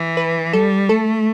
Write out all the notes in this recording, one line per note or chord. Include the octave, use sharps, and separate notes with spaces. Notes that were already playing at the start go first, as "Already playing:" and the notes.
Already playing: E3
B4
G3 A4
A3 A4